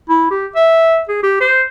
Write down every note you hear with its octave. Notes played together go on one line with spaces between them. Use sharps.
E4
G4
E5
G#4
G4
C5